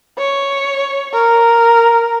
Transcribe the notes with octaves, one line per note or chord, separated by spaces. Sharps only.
C#5
A#4